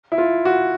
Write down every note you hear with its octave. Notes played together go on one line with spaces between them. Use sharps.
E4
F4
F#4